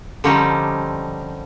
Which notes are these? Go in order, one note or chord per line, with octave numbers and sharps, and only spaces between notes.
D3 F3 G3 C4 C#4 D#4